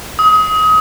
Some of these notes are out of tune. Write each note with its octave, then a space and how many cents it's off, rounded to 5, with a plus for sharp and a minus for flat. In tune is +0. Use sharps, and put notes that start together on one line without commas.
D#6 +25